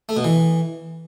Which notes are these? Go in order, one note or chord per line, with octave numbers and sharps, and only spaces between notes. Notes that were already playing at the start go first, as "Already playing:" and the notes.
A3
B2
E3